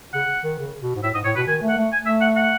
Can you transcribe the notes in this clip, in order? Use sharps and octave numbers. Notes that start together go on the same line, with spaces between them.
C#3 F#5
D#3
C#3
B2
G#2
A2 E5
G#2 D#5
A2 C#5
B2 B4
D#3 G#5
A3
F#5
A3
G#5
A3 E5
F#5
F#5